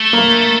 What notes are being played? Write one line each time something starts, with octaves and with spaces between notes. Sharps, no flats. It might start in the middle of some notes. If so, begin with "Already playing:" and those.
Already playing: A3
A#3